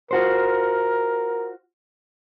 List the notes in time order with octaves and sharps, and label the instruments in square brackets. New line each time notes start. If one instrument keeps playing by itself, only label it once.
[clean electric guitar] F4 F#4 C5 [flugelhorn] A#4